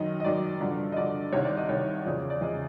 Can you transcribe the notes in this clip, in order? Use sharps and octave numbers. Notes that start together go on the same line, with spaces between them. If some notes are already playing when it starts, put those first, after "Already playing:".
Already playing: F#2 D#3 F#3 D#5
D#5
F#2 D#3 F#3 D5
G2 D3 F3
D#5
G2 D3 F3 D5
C2 C3 D#3 C#5
D5
D#5
C2 C3 D#3 C#5
E2 C#3 F3 D5
D5
E2 C#3 F3 D#5